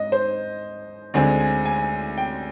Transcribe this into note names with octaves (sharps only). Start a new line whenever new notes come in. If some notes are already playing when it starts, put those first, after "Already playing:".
Already playing: G#2 D#5
C5
D2 D3 G#3 C4 G#5
G#5
G#5
G5